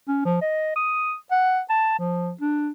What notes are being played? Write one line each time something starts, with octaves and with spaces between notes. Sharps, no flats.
C#4
F3
D#5
D#6
F#5
A5
F3
D4